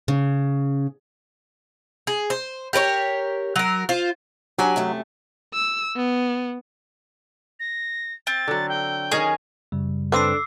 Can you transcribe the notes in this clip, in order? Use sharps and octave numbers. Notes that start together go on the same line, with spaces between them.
C#3
G#4
C5
G4 A#4 B4 C#5
F#3 A#4
F4 C5
F#3 D4 G4 G#5
F#2 C3 A3
E6
B3
A#6
C4 A6
D3 F#3
G5
D#3 C#4 G#4 D#5
F#2 C#3 G3
C4 D4 A4 B4 D6 E6 C7